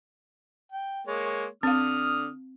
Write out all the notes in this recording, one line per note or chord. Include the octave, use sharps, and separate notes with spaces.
G5
G#3 A#3 C#5
D3 C4 F5 D#6 F6